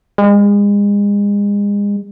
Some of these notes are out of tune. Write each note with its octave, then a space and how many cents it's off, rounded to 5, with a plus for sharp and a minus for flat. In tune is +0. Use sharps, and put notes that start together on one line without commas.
G#3 -35